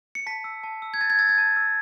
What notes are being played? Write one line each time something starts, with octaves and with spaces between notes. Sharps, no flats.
C#7
A5 B6
E6
A5
E6
G#6
A5 A6
G#6
E6 A6
G#6
A5
E6